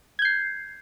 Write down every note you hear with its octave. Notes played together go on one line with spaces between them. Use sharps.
G6 G#6 C7